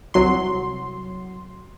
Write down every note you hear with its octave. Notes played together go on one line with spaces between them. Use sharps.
C2 F#3 C6